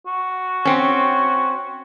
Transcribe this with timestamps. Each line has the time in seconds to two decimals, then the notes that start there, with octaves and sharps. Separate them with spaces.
0.07 F#4
0.65 C4 C#4